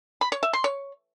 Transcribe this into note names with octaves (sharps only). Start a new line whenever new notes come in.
B5
C#5
E5
C6
C#5